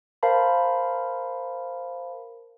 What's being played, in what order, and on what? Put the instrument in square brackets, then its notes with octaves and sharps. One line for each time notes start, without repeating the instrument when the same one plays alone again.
[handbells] A#4 C5 F5 A5 B5